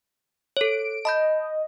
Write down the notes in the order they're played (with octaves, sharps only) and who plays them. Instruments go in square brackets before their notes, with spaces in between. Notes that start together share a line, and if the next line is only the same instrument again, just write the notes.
[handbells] A4 C#5 [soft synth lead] D7
[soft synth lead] D#5 [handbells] A5 B5 G6